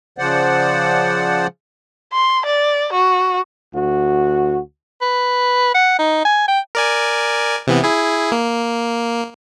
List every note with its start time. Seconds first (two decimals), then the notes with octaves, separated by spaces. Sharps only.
0.18 C#3 F3 C5 D5 F#5
2.13 C6
2.45 D5
2.93 F#4
3.74 D2 F#4
5.02 B4
5.74 F#5
5.99 D#4
6.25 G#5
6.48 G5
6.75 A#4 D5 G#5
7.67 C3 E3 B3
7.84 E4 G#4
8.32 A#3